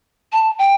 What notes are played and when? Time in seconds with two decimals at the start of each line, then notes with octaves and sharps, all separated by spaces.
0.33 A5
0.59 G5